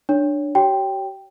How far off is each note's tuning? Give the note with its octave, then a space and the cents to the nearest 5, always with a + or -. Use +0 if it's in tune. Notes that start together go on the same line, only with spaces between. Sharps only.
D4 +15 C#5 +15
G4 -45 C#5 +0 G5 +0